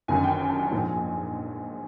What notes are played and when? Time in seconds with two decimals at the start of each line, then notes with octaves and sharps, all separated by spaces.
0.08 G1 F#2 D#3 G#5
0.24 G5
0.40 G#5
0.49 A5
0.58 G#5
0.71 A#1 G#2 F3